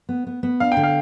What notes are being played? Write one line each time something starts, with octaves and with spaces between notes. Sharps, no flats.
B3
B3
B3
D4 F5
G5
D3
F5